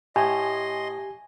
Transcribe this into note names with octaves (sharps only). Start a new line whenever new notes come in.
A2 G4 D#5 G#5 C6